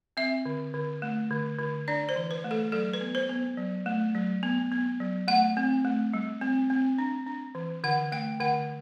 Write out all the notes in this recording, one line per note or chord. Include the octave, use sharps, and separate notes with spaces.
C4 E5
D3
D3
A3
D3
D3
D4 D5
C5
E3
B4
A3
A4
F#3 A4
B4
B3
C5
B3
F#3
A3
F#3
B3
B3
F#3
A3 F#5
C4
A3
G3
C4
C4
D4
D4
E3
D3 F#5
A3 G5
D3 F#5